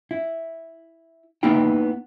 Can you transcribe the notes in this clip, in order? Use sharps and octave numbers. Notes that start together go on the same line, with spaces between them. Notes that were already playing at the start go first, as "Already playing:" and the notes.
E4
A#3 B3 D#4 E4 G5